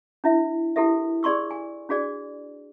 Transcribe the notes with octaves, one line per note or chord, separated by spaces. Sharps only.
D4 E4 E5
E4 G4 A4 A#4 E5
G#4 D5 C6 C#6 E6
G#5
D4 F#4 G#4 D5